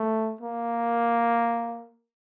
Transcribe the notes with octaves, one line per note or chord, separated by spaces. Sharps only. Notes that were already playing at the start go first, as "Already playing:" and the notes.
Already playing: A3
A#3